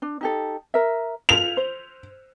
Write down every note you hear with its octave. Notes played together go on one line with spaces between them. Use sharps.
D4
D#4 G4 A4
A#4 E5
F4 F7
C5